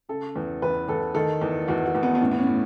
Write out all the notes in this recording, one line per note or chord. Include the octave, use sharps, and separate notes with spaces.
C#3 A4
E2
E2 B4
E2 A4
D#3 A4
E2
E2 F#4
F#4
E2
B3
B3
A2 C#4
B3
C#4
A2